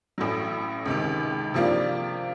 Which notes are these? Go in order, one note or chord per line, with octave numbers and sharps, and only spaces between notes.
A1 A2 F#3
C#2 C3 D#3
C3 F3 A#3 D4 F4